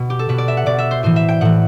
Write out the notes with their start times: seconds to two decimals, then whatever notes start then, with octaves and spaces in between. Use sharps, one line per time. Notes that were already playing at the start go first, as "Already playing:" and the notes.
Already playing: B2
0.10 G4
0.19 A4
0.29 B2 B4
0.38 D5
0.48 E5
0.57 F#5
0.66 B2 D5
0.79 E5
0.91 C5
1.03 A2 E3 C5
1.16 E5
1.29 G5
1.41 A2 E3 F#5